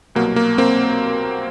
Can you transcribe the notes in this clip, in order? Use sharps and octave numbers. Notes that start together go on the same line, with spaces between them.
C2 B2 F#3 A#3
A#3
A#3 C4